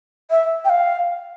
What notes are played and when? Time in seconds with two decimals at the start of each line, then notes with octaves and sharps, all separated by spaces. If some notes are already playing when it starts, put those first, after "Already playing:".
0.30 E5
0.65 G5
0.70 F5